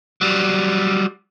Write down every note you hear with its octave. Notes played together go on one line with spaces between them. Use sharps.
F#3 G3